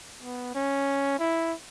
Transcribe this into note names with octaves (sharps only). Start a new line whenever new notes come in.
B3
C#4
E4